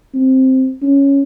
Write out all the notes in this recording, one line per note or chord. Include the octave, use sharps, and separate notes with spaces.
C4
C#4